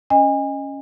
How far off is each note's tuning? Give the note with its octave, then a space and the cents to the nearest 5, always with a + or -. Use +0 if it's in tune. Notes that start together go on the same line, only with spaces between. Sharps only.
C#4 +0 D#5 +0 G#5 -35